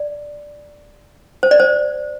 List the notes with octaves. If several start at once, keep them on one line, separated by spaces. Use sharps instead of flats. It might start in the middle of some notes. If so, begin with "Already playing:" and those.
Already playing: D5
C5
D5
C5